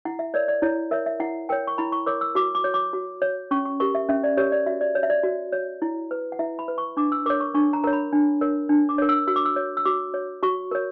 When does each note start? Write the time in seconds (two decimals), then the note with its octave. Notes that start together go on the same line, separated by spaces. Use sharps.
0.05 E4 F#5
0.19 E5
0.34 A#4 C#5 D5
0.48 D5
0.62 E4 C#5
0.91 A#4 C#5 E5
1.06 E5
1.20 E4 F#5
1.49 A#4 C#5 G5
1.67 C#6
1.78 E4 B5
1.92 C#6
2.06 A#4 C#5 D6
2.21 E6
2.35 F#4 D6
2.55 D6
2.64 C#5
2.74 D6
2.93 F#4
3.22 C#5
3.51 C#4 C#6
3.65 C#6
3.80 G4 A#4 C#6
3.95 E5
4.09 C#4 E5
4.24 D5
4.37 G4 A#4 C#5
4.52 D5
4.66 F#4 E5
4.81 D5
4.95 C#5
5.03 E5
5.10 D5
5.23 F#4
5.53 C#5
5.82 E4
6.11 B4
6.32 F#5
6.39 E4 E5
6.59 B5
6.68 B4
6.78 C#6
6.97 D4 D6
7.12 E6
7.26 A#4 C#5 D6
7.40 C#6
7.55 D4 C#6
7.73 A#5
7.84 A#4 C#5 A#5
7.93 B5
8.12 D4
8.41 A#4 C#5
8.69 D4
8.89 D6
8.98 A#4 C#5
9.09 E6
9.27 F#4 E6
9.36 D6
9.45 E6
9.56 C#5
9.77 E6
9.85 F#4 D6
10.14 C#5
10.43 F#4 C#6
10.71 A#4 C#5